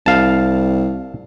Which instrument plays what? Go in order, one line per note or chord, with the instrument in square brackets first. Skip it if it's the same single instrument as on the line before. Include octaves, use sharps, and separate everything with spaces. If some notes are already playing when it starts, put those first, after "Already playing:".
[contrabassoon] C2 [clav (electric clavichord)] F5 A5